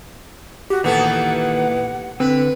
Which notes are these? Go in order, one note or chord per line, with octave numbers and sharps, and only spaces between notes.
F#4 G4
A#2 D#3 E3 B3 A4 F#5
D3 C4 B4